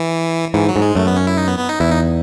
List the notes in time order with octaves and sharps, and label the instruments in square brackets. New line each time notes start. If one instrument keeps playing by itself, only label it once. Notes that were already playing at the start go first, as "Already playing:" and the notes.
Already playing: [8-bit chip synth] E3
[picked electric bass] G#2 [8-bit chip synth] E3
[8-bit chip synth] F#3
[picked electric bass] G#2
[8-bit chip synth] G#3
[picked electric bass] F#2 [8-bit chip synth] A3
[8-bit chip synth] B3
C#4
E4
D#4
B3
B3
D#4
[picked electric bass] E2 [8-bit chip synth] E4
[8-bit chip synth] D#4